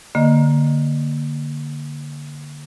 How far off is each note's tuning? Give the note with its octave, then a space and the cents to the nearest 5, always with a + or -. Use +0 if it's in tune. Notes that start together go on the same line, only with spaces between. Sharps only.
D3 +0 A#3 +0 D#5 +0